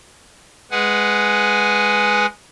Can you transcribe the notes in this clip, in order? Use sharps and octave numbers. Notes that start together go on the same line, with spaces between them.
G#3 G#4 B4 F#5 G#5